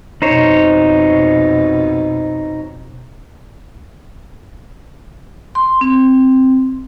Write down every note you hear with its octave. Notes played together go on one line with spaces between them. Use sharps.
F2 B2 D#4 C5 C#5
C6
C4